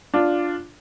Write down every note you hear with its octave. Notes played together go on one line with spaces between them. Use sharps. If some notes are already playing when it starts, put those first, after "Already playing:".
D4 F4